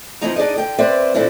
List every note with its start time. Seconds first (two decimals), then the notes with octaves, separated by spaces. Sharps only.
0.21 C3 E3 F3 C4 D#4 A#5
0.36 D4 D#4 G#4 D5 D#5
0.55 D3 G5
0.79 C4 B4 C5 D5 E5
1.14 A#2 D3 E3 C4 D4 E4